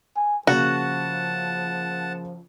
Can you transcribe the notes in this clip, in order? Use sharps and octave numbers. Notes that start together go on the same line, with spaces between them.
G#5
C#3 F3 A#3 F#4 F#5 A5